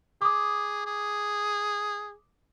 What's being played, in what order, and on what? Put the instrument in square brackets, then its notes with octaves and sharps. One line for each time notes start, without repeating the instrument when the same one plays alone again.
[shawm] G#4 [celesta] D6 D#6
[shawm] G#4